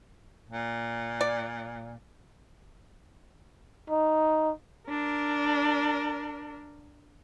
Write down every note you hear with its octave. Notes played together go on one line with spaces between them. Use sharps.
A#2
D5
D#4
D4 A#4